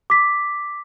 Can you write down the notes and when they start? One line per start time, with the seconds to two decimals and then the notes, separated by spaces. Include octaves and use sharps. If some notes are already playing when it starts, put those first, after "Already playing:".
0.10 D6 B6